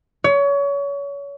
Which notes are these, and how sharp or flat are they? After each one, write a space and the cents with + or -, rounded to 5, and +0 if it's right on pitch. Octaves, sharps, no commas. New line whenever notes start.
C#5 +30